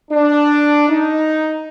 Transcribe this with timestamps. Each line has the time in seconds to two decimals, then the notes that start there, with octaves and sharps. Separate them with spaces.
0.11 D4
0.89 D#4